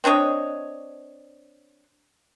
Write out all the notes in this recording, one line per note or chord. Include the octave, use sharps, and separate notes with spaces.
C4 D4 C#5 D#5